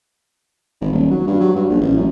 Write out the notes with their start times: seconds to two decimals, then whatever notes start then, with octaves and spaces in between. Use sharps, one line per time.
0.81 G#1
0.92 D#1
1.11 F#3
1.27 G2
1.40 F#3
1.55 G2
1.69 A#1
1.81 A1
1.97 F#2